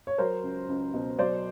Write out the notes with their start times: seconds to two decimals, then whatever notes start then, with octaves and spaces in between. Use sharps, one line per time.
0.07 C#5
0.18 F#3 A#4 C5
0.43 C#2
0.69 C#2
0.94 B2
1.19 F#3 C5 D5